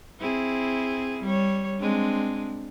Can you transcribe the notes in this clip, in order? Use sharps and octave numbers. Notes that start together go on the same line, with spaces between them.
C4 E4 G#4
G3 C#5
G#3 C4 D4